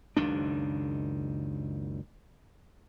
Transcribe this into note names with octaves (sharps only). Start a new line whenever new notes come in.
F#1 C#2 D#3 D4